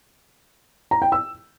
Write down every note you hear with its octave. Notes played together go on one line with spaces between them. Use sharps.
A#5
G5
E6